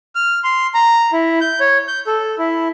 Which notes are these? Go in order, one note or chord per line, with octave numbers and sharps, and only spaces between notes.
F6
C6
A#5
E4
G6
C#5
G6
A4
E4